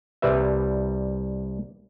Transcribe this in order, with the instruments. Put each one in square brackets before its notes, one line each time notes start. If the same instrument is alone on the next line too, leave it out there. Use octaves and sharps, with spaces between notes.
[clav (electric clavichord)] C2 G3 B4 E5